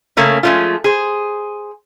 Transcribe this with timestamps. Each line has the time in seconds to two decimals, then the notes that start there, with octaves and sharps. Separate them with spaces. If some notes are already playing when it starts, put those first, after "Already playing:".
0.17 C#3 A3 A#3 C#4
0.43 F3 G#3 A3 C#4 F4
0.84 G#4 C5